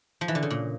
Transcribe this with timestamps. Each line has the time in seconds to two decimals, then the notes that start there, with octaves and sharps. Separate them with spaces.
0.21 F3
0.28 E3
0.35 D3
0.43 C#3
0.50 A#2